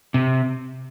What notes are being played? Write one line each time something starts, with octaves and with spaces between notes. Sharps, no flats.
C3